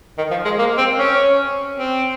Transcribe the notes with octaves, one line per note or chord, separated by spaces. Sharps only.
D#3
F3
G#3
A#3
C4
C#4
C4